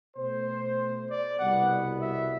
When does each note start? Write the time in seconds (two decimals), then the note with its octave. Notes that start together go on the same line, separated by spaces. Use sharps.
0.16 B2 A3 C5
1.09 D5
1.39 C2 B2 G3 B3 F#5
2.01 E5